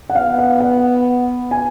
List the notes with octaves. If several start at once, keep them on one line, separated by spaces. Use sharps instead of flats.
F#5
B3 F5
F#5
F#5
G#5